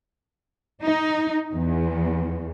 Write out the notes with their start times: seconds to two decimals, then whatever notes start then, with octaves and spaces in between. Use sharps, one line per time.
0.82 D#4
1.54 E2